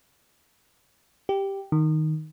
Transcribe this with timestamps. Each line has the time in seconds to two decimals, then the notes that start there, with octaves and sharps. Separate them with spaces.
1.29 G4
1.72 D#3